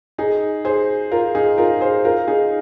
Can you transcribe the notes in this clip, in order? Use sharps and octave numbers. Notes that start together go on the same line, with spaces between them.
D#4 G#4
G#4 C5
F4 A#4
D#4 G#4
F4 A#4
G#4 C5
F4 A#4
D#4 G#4